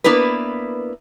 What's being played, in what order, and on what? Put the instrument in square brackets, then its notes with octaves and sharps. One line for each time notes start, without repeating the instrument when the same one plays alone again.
[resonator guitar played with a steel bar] A#3 B3 D4 E4 B4